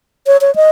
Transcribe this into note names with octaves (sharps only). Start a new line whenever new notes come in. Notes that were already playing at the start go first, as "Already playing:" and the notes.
C#5
C#5
D#5